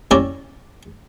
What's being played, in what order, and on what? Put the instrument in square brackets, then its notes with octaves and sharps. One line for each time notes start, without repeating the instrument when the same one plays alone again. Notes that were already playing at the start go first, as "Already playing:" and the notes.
[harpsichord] C#4 E4 G4 D5 A#5